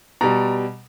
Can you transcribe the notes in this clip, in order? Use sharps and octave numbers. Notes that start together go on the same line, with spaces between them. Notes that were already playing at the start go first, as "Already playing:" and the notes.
B2 G3 A#5